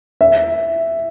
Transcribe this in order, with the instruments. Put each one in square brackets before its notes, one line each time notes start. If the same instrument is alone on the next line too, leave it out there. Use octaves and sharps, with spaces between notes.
[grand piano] E5